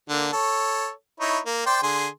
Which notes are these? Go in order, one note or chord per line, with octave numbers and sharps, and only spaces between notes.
D3 A#3
A4 C#5
D#4 E4 C#5
A#3
C5 D5 G5
D3 G#4 C6